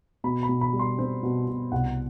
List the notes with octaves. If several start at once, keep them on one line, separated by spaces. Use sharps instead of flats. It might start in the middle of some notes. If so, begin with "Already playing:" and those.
B2 B5
B5
B2
B5
G3
C6
C4
B2
B2
C2 F#5